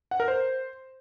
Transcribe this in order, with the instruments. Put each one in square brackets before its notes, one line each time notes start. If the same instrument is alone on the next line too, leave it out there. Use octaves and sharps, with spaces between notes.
[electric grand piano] F#5
A#4
C5